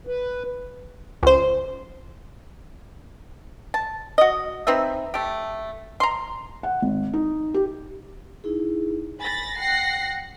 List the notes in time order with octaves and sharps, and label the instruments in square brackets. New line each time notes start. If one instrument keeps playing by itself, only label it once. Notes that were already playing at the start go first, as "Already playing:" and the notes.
[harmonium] B4
[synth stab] C#2 C5
[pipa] A5
F#4 D#5
C4 D#4 B4 E5
A3 G4
A#5 C6
[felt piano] F#5
G#1
D#4
G4
[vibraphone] D#4 E4 G#4
[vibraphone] G#5 [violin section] B5 A6 A#6
[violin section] F#5 A#6 C7 [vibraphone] G5